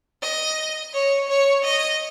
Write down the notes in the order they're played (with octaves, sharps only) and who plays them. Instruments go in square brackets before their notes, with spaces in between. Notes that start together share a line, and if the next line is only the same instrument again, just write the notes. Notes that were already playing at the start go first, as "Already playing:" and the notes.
[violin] D#5
C#5
C#5
D#5